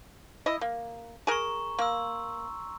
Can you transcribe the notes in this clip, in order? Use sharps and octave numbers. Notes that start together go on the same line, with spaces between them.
E4 D#5
A#3
G#4 A#4 A#5 C#6
A#3 C6 E6